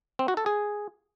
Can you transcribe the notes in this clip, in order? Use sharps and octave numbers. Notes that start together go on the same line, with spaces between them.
C4
F#4
A4
G#4